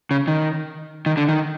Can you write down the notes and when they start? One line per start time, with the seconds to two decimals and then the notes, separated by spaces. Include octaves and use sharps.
0.11 C#3
0.28 D#3
1.06 D#3
1.17 D3
1.29 D#3